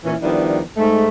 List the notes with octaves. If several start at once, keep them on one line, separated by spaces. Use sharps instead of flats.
A#2 E3 C#4
D#3 F3 G3 B3 D4 E4
G#2 A3